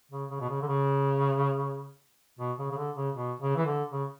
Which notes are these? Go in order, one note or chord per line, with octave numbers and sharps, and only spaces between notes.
C#3
C#3
B2
C#3
D3
C#3
B2
C#3
C#3
D3
C#3
B2
C#3
E3
D3
C#3